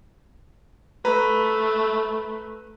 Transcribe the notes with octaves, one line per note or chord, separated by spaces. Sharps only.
A3 B4 A#5